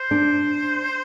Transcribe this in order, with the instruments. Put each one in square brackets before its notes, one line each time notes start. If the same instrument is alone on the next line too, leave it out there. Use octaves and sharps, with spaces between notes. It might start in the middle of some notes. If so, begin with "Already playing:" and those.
Already playing: [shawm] C5
[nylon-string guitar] D4